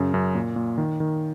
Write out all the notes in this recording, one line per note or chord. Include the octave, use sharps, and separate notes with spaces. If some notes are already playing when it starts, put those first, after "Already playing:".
Already playing: F#2 C#3
F#2
A#2
A#2
D#3
D#3